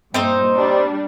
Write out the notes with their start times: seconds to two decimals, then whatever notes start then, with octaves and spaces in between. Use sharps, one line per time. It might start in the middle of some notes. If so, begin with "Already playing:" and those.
0.14 G2 A#2 C4 D#4 C5
0.55 G3 D4